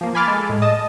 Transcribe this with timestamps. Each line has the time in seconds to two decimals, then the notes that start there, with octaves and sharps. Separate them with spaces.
0.01 F3 A#3
0.15 G#5 B5 C6 D6 F6 A6
0.28 G#3 A4
0.49 A2 G#3
0.62 D#5 A5 D#6